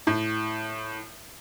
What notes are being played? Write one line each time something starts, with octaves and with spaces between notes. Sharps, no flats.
A2